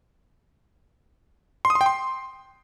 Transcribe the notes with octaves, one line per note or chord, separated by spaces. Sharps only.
C6
D#6
C6
G5
C6